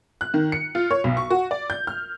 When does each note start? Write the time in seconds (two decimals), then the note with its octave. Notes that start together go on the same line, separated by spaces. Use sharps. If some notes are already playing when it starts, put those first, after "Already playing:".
0.21 F#6
0.34 D#3
0.52 C#7
0.75 F4
0.91 C#5
1.04 B1
1.17 C#6
1.30 F#4
1.51 D5
1.70 G6
1.87 F6